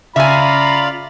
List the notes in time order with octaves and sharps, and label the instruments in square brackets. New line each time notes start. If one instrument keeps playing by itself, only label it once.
[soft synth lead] C#3 [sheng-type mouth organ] F4 D5 F5 [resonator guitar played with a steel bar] E5 G#5 [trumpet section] A#5 B5